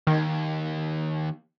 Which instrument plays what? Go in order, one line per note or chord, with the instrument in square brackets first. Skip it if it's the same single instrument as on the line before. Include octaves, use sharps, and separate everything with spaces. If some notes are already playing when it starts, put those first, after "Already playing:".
[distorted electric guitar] D#2 [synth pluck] D#3